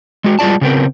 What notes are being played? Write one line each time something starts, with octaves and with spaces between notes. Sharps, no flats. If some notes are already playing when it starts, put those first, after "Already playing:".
G#3 F#4
G3 G#3 F4 D5 A5
C#3 B3 C4 A#4